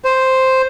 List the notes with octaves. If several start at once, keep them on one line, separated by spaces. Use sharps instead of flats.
C5